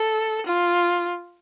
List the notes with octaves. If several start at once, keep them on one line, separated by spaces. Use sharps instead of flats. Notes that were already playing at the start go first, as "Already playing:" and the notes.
Already playing: A4
F4